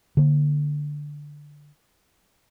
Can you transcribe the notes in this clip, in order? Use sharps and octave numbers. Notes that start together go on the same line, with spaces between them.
D3 A#3